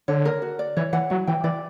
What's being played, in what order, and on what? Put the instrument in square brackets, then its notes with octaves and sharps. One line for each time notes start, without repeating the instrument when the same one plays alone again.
[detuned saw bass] D3 [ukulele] C#5
[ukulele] A#4
F#4
D5
[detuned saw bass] E3 [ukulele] C#5
[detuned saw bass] E3 [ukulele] F#5
[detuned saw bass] F#3 [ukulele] E4
[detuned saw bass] E3 [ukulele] G5
[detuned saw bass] E3 [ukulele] D5